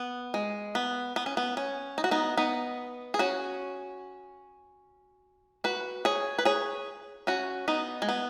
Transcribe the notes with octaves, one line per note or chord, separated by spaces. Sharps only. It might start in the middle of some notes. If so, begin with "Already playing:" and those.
Already playing: B3
G#3
B3
B3
C#4
B3
C#4
D#4
F#4
B3 D#4
B3 D#4
G#4
C#4 F#4
F#4 B4
G#4 C#5
B4
G#4 C#5
C#4 F#4
B3 D#4
G#3
B3